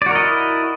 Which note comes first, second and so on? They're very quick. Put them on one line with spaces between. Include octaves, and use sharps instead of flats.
D5 F#4 A#4 D#5 E4